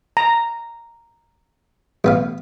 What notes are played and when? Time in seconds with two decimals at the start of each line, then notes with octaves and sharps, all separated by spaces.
0.17 A#5
2.04 A1 B3 F5